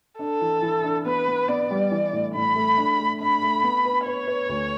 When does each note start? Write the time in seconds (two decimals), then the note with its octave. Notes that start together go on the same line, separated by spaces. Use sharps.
0.19 D4 A4
0.41 E3
0.62 E3
0.84 D4
1.06 B3 B4
1.27 B3
1.48 B3 D5
1.70 G3
1.91 E3
2.13 A2
2.35 A2 B5
2.56 A3
2.78 D4
2.98 A3
3.20 D4 B5
3.42 A3
3.64 B3
3.85 B4
4.06 B4 C#5
4.27 B4
4.49 D2